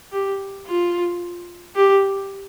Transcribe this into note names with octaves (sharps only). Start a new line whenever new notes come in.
G4
F4
G4